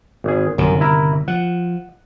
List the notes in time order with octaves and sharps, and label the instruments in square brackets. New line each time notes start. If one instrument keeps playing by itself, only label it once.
[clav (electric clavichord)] G#1 G#4
[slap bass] G1 C3 D#3 [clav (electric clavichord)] F#2
[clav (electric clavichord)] E4 A#4 A#5
[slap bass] F3 [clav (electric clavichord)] F#5